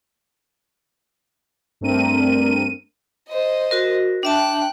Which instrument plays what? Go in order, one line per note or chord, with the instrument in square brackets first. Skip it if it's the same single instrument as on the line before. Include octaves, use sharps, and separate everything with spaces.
[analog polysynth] G2 A3 C4 D4 A#4 D#7
[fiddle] C5 D#5
[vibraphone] F#4 A#4
[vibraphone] D4 E5 A5 [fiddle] G5 F#6